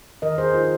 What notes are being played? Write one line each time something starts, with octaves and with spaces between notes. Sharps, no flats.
D#3 A#4 D#5
G#4 C5
D#4 F4